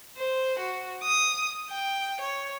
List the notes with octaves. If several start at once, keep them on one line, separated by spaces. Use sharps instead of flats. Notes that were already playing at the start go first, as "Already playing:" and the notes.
C5
F#4
D#6
G5
C#5